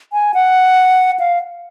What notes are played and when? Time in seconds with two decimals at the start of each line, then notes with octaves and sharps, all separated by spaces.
0.13 G#5
0.34 F#5
1.20 F5